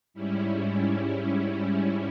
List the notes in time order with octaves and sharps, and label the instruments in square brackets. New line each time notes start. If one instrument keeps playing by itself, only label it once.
[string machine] G#2 G3 C#4 E4